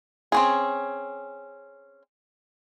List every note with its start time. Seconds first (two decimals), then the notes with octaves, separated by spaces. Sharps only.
0.32 C4 C#4 G#4